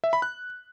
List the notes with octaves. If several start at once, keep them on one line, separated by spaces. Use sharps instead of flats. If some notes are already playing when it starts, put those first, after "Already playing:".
E5
B5
F#6